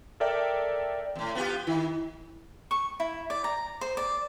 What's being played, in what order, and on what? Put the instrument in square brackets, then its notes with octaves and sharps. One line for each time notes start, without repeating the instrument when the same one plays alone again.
[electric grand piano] A4 A#4 D5 E5 G5
[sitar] E2 A2
B3 F4 G4
[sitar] D#3 [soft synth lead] E4
[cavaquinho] C#6
E4
D5
A#5
C5
D5